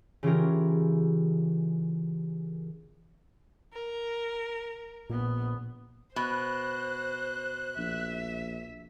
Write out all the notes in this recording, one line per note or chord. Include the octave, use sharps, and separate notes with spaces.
C#3 E3 C#4 F4 G4 A#4
A#4
A#1 A#2 B3
B2 C5 F#6
A#1 E5